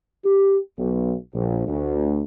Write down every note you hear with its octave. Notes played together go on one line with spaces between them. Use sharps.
G4
B1
A#1
D2